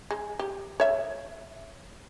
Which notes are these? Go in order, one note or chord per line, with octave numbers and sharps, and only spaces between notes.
G#3
G4
C#5 E5